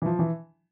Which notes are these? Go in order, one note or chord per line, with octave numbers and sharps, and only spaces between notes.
E3
F3
E3